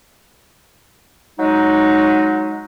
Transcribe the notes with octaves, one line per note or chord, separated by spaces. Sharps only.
F#3 G#3 D#4